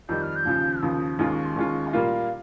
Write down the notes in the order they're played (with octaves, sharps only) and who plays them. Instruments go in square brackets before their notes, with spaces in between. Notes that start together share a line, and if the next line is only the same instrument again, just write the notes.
[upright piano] F2 D#3 G3 [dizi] G6
[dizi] F6
G6
[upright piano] D#2 C#3 F3
[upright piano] D#2 C#3 F3 [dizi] D#6
[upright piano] D#2 D#3 G#3 C#4 F4 [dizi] D#6
[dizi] C#6
C6
[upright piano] D#2 D#3 G#3 C#4 F4 [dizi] C#6
[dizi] D#5
[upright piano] A#2 G3 A#3 F4 [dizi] F5